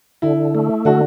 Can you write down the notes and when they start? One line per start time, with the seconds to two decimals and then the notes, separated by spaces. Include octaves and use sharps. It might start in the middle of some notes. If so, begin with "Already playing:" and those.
0.22 D3 E4
0.55 A3
0.85 D3 F#4